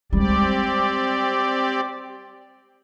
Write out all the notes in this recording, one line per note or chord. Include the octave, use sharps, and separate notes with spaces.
G3 G#3 C4 G4 D5